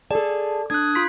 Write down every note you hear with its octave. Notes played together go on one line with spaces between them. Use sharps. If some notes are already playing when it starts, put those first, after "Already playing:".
G#4 A4 D5 A5
D4 D#6 F#6 G#6
F4 C6 B6